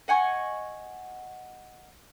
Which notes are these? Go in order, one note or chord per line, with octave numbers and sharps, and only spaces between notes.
D#5 F#5 G#5 C#6